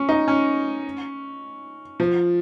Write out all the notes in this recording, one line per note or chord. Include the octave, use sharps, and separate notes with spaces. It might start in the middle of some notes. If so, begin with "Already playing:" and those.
Already playing: C#4
D#4
C#4
F3